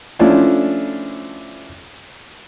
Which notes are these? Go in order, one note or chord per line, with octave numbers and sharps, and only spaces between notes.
F3 A3 C#4 D4 E4 F4